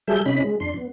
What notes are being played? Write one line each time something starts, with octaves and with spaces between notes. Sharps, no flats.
F#3 G3 G#4 A4 E5 G6
C3 C#4 D#4 B5
G#3
F2 D4 C6
B3